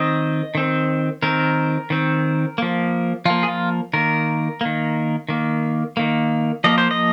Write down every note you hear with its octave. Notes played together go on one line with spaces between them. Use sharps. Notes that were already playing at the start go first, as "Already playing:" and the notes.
Already playing: D#3 C4 D#5
D#3 C4
D#3 C4 A#4
D#3 C4
F3 A#3
F3 A#3 F4
G#4
F4
D#3 A#3 A#4
D#3 A#3
D#3 A#3
D#3 A#3
F3 A#3 D#5
C5
D#5